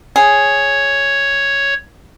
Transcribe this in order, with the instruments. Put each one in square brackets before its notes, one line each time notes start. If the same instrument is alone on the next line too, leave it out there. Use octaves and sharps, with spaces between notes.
[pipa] G#4 [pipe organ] C#5